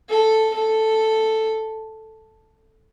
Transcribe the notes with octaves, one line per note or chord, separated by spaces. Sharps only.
A4
A4